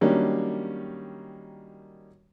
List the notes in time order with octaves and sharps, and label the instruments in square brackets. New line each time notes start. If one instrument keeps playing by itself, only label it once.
[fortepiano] D#3 F#3 G3 A#3 C#4 D4